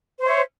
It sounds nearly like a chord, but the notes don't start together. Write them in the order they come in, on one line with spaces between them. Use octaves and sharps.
C5 C#5 E5